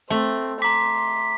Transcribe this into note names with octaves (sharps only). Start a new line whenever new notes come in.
A3 C4
A#5 C6 D6 B6